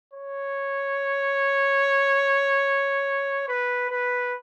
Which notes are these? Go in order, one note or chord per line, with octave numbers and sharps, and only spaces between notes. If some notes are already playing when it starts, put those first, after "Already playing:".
C#5
B4
B4